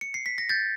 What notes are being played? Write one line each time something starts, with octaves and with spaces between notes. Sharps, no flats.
C#7
C7
B6
A#6
G6 A6